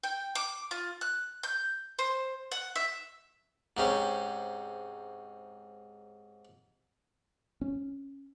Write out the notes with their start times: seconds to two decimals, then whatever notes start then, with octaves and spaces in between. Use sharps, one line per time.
0.03 G5
0.35 D6
0.71 F4
1.01 F#6
1.43 G6
1.99 C5
2.52 F#5
2.76 E5
3.77 G#2 C3 C#4
7.61 C#4